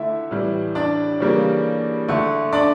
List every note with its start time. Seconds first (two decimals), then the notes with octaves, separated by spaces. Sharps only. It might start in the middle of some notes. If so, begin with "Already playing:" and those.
Already playing: D3 A3 E4 E5
0.31 A2 E3 G3
0.75 D4 D5
1.20 C#3 E3 G3 A#3
2.08 D3 A3
2.53 D4 D5